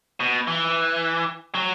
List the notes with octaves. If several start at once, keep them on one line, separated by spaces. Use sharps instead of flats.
B2
E3
F#3